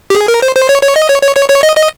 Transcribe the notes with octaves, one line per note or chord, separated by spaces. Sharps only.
G4
G#4
A#4
C5
C5
C#5
C#5
D#5
C#5
C#5
C#5
C#5
D#5
D#5